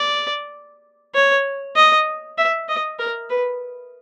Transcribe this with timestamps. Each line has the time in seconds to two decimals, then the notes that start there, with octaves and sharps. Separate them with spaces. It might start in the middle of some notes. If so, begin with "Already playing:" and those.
Already playing: D5
1.15 C#5
1.76 D#5
2.38 E5
2.68 D#5
2.99 A#4
3.30 B4